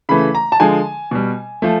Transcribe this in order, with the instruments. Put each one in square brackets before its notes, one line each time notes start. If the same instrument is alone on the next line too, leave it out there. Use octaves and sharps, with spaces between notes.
[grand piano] C#3 E3 A3 B5
A#5
A5
D3 F3 G#3 G#5
B2 G3
F3 A3